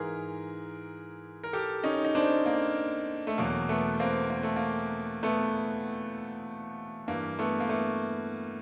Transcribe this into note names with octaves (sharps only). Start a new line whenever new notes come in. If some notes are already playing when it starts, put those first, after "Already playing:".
Already playing: G#2 E3 G#4 A#4
A#4
G4 A4
C#4 D#4
D#4
C4 D4
A#3
A3
E2 B2 F#3 A#3
A3 B3
A#3 C4
A#3
A3
A#3
A3 B3
G2 E3 A#3
A3 B3
A#3
A3 B3